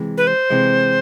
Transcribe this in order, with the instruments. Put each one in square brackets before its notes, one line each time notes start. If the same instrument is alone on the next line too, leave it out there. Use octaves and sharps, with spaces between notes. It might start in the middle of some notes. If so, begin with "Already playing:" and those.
Already playing: [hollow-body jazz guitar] C3 E3 G#3
[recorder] B4
C5
[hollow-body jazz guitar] C3 E3 G#3